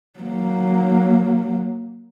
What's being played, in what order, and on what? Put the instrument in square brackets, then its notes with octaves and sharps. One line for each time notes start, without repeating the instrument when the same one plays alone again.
[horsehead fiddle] F#3 A#3